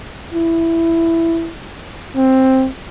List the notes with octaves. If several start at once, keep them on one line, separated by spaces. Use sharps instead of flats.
E4
C4